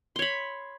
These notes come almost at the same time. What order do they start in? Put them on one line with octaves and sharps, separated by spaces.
C6 C#5 B5